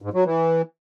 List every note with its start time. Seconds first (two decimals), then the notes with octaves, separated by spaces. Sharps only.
0.02 G#2
0.13 F#3
0.25 E3